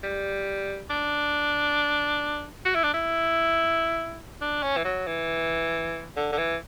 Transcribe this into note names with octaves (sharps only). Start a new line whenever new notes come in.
G3
D4
F#4
E4
D4
E4
D4
C#4
E3
F#3
E3
D3
D3
E3